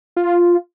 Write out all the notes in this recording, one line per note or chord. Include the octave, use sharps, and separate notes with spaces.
F4